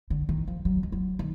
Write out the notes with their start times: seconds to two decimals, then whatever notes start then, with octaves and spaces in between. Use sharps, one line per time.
0.10 D3
0.29 D#3
0.47 F3
0.65 F#3
0.83 G#3
0.92 F#3
1.19 D#3